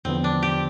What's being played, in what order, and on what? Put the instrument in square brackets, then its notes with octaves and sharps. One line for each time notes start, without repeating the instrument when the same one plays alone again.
[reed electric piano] E2 D3 F3 B3 [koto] C4
[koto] D4
G4